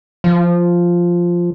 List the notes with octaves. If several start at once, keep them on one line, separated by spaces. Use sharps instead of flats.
F3